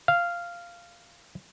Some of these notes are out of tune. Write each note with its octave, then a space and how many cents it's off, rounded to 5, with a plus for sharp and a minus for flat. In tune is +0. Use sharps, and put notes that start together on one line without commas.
F5 -10